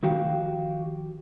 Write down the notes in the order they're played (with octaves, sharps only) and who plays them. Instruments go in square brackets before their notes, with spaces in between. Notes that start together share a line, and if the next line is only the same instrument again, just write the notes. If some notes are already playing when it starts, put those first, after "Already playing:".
[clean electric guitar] D#3 F3 F#4 G4 F5 G5